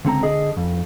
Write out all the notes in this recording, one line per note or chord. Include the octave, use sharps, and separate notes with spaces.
C#2 D3 C4 A#5
D3 G#4 D#5
F2